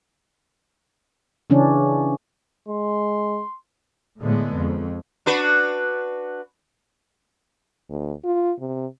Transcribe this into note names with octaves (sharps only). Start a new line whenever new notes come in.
C#3 E3 C#4 D4
G#3 C6
A2 D3 G#3 B3
F2
D4 F#4 B4
D2
F4
C3